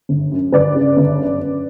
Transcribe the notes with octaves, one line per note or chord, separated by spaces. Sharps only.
G1
F#2
G1 B4 D5
C#3
G1
F#2
F#2